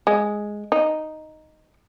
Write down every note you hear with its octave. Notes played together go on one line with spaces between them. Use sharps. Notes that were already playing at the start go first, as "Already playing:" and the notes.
G#3
D#4